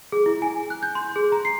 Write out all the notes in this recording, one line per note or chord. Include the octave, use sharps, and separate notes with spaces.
G#4
E4
G#5
F#6
G6
C6
G#4
A#5
C7